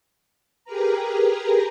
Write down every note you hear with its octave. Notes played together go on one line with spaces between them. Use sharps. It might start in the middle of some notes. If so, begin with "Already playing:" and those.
G4 G#4 A#4 B4 A#5